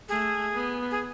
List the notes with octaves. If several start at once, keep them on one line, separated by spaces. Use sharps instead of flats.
A3 G#4
B3
G#4